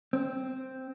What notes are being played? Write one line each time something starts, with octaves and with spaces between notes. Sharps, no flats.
C4